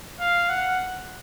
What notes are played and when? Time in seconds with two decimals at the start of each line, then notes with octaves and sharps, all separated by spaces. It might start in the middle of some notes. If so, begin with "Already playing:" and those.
0.20 F5
0.49 F#5